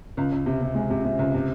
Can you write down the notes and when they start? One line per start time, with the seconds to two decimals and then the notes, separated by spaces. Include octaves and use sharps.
0.17 C#2
0.32 C#2
0.46 C3
0.61 C3
0.75 G#3
0.90 C3
1.05 C3
1.19 C#2
1.34 C3